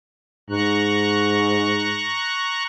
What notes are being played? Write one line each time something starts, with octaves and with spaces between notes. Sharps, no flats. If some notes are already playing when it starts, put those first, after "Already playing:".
G#2 A#5 C#6 F#6